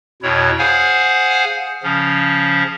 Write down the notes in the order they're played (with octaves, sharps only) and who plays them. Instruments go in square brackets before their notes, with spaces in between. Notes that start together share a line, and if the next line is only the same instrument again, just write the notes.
[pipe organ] F2 B2 E4 C#5
G#4 C5 F5 F#5 G#5
C#3 F3 C#4